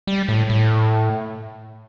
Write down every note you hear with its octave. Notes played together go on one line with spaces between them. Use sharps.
G3
A2
A2